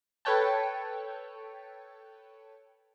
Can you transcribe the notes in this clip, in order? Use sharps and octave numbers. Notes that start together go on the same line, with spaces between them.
A4 B4 C#5 G5 A5